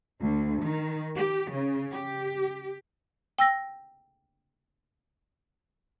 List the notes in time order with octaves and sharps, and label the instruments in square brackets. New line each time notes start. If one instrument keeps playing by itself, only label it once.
[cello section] D2
D#3
G4
C#3
G4
[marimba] G5 E6 A#6